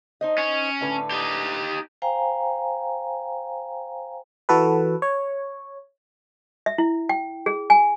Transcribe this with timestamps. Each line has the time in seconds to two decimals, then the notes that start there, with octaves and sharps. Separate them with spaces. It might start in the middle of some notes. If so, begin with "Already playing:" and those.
0.21 D#4 C5 D#5
0.38 C#4
0.81 A2 D3 B4
1.11 D#4 G4
2.02 C5 F5 G5 G#5 A#5
4.49 E3 F#4 A4 B4
5.02 C#5
6.66 E5
6.78 E4
7.09 G5
7.46 G#4
7.70 G#5